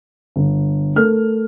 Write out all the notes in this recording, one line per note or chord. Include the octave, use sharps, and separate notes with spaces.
G1
A3 A#4 F6